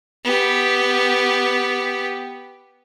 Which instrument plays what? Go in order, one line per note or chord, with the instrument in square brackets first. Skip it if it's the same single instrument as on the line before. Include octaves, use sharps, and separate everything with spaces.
[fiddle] B3 G4